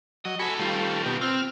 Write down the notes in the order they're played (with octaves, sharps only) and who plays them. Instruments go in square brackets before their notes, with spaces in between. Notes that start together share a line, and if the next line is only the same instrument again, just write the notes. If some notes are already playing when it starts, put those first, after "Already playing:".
[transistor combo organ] F#3 [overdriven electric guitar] D#5
[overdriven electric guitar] F#4 A4 [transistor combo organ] G#5 B5
[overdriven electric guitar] D#3 F4 [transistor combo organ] G3 A3
[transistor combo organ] B2 G4
[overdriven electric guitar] C4 [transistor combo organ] F6